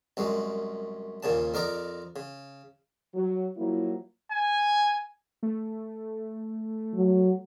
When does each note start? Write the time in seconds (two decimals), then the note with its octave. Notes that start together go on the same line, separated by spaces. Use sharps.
0.17 C2 F#2 G#3
1.23 D#2 A#2 C#3 A5
1.54 F2 A#4 D5 D#5 A#5
2.16 C#3
3.14 F#3
3.56 F3 F#3 A#3 E4
4.32 G#5
5.43 A3
6.95 F#3